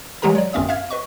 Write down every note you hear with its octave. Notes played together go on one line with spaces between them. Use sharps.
E3 F#3 G#3 G4 A#4 A#5
C#5 D5
G1 F#2 C4 C#4 E5 D#6
E5 F5 F6 G#6
B4 D#5 C#6